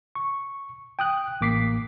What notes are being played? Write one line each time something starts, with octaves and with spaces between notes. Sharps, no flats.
C#6
G5 D#6 F#6
A1 A#3 D6 B6 C7